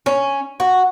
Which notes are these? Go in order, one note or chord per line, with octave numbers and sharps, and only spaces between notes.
C#4
F#4